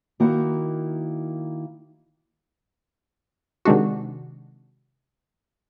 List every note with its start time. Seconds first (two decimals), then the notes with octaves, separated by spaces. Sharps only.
0.20 D#3 A#3 E4 F#4 F#5
3.65 C3 D#3 G#3 D4 F#4